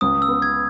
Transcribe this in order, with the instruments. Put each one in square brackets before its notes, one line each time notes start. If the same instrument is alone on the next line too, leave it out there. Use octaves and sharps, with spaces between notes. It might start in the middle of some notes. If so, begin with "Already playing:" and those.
[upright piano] C#2 [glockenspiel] D#6
[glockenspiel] E6
[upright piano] B3
[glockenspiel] G#6